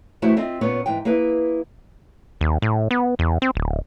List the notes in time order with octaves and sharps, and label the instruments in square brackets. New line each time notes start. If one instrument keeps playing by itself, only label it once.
[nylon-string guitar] E3 A3 E4 F#4 C5 E5
C4 F4 D#5 E5
A#2 B3 C#4 F4 C#5
G#2 E3 G5
A#3 E4 G#4 B4 E5
[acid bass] D#2
A2
B3
E2
C4
D1